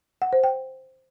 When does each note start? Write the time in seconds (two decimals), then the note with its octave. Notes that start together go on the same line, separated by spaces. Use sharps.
0.22 F#5
0.33 C5
0.44 G5